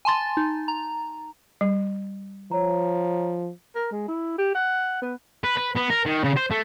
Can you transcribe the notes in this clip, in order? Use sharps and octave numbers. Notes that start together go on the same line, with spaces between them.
G#5 A5 C6 A6
D#4
A#5
G3
F3 C#5 A#5
A#4
G#3
E4
G4
F#5
B3
B4
B4
B3
A#4
D#3
C#3
C5
A3